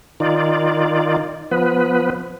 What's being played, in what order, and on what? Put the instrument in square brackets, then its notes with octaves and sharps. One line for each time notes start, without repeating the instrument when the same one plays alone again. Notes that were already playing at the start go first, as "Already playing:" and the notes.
[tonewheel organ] D#3 D#4 F4 D5
F3 B3 B4